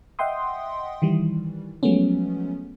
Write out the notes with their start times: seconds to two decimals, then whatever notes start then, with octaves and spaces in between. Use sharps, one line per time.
0.19 D#5 E5 F#5 G5 C6 D#6
1.02 D#3 E3 G3
1.83 F3 F#3 G#3 A3 B3 C#4